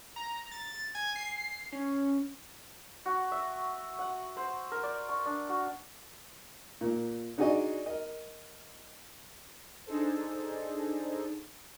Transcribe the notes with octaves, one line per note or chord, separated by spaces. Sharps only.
A#5
A6
G#5
C7
C#4
F#4
E5
F#5
C5
A#4
D5
C#6
D4
F#4
A#2
D4 D#4 F#4 G#4 D5 D#5
A#4 D#5
D4 D#4 G#4 A4 C5